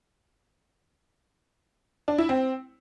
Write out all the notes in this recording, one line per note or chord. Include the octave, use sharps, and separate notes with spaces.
D4
E4
C4